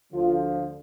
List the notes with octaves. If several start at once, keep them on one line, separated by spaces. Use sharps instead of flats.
D2 D3 F3 F4